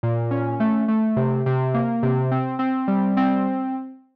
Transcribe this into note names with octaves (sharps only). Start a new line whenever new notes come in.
A#2
C#4
A3
A3
C3
C3
A#3
C3
C4
C4
G3
C4